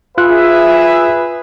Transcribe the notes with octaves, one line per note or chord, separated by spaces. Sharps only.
F4 G#4 B4 E5 F#6